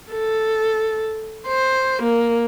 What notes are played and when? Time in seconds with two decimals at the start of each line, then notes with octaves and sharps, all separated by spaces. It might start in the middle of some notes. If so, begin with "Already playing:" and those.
0.12 A4
1.48 C5
2.03 A#3